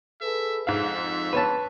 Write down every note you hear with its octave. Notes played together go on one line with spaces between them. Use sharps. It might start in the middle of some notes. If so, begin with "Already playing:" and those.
G#4 A4 B4 E5
F2 G#2 E5 F5
B4 C#5 A5